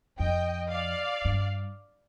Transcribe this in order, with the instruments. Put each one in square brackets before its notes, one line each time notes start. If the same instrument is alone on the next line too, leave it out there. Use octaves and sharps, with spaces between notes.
[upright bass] F2 [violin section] D#5 G5
[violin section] D5 F5
[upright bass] G2